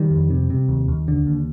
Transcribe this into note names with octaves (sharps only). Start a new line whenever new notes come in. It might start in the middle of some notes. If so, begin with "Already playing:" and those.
Already playing: D#3 G3
F2
C3
C3
D#2
D#2
D3
D#2